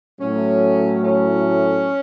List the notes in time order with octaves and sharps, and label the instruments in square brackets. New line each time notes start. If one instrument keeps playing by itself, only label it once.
[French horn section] A2 F#3 A3 [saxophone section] C#4
[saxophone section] C#4